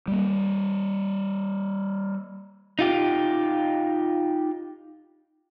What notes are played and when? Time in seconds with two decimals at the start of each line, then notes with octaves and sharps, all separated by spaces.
0.08 G3 A#3
2.79 D#4 F4 G4